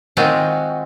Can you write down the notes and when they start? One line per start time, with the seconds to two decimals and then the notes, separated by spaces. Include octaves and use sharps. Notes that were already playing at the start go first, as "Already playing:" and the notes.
0.17 D#3 G#3 C4 F4 F#4